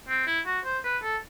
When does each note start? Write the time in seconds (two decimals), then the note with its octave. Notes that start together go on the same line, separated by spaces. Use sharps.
0.09 C4
0.27 E4
0.46 F#4
0.65 C5
0.84 B4
1.04 A4